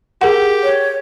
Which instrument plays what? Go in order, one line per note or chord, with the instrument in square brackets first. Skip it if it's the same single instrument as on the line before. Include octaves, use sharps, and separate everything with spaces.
[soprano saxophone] G4 [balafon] G#4 A#4 F#5
[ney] C#5